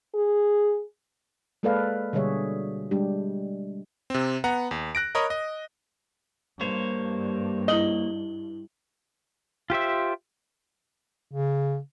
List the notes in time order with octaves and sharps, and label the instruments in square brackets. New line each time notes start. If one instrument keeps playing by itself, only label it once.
[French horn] G#4
[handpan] G#3 A#3 A4 B4 D5 F5
B2 D3 G3 G#4 C#5 E5
G3 G#3 D4 G4
[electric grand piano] C3 C4
B3 F#5 A#5
D#2
F#6 A#6 D7
A#4 C#5 D#5 B5 D#6
D#5
[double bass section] G2 [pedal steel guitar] A#3 C5 C#5
[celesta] E4 F#7 G7 [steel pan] D#5
[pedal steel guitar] F4 G4 C5 E5
[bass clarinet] C#3